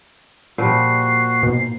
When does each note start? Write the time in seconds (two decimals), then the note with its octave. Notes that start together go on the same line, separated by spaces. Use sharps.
0.58 A#2 F3 G3 F#4 C7
1.43 G#2 B2